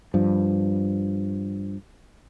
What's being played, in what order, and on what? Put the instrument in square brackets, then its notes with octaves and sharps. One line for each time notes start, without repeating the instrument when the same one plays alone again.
[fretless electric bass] G2 F3